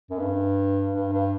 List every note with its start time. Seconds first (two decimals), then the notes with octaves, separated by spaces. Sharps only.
0.10 F#2
0.19 G2
0.93 G2
1.12 G2